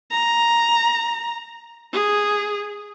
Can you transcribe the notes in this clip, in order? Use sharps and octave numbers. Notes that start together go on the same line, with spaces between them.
A#5
G#4